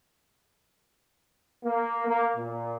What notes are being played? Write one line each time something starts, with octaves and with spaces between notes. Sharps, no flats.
A#3
A#3
A#2